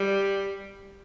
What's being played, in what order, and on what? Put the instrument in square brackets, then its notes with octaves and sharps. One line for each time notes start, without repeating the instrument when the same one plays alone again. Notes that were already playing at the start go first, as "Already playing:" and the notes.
Already playing: [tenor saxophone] G3